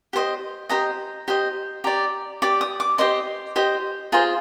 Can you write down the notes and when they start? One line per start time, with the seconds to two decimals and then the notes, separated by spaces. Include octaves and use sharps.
0.13 G4 C5 D#5
0.69 G4 C5 D#5 A#5
1.28 G4 C5 D#5
1.84 G4 D5 A#5
2.42 G4 D5 D6
2.61 D#6
2.80 D6
2.98 G4 C5 D#5 C6
3.56 G4 C5 D#5
4.12 F4 G#4 C5 A#5